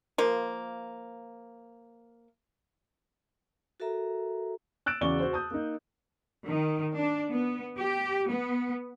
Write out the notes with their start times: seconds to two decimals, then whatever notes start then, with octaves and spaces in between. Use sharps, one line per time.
0.18 F3 A#3
3.80 F#4 A4 A#4 E5 A#5
4.86 E6 F#6 A6 D7 E7
5.01 E2 C#3 F#4 D5 C#6 G7
5.20 F#4 C5
5.33 A5 D#6 G6
5.51 A#3 D#4
6.46 D#3
6.95 D4
7.31 B3
7.77 G4
8.28 B3